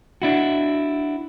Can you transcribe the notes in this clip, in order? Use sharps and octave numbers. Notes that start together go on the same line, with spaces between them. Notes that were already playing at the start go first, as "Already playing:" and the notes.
D4 E4 F#4